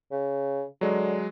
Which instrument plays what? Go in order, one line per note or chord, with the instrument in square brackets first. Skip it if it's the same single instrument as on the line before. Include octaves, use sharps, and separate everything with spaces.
[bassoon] C#3
[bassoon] D3 [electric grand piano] F#3 G#3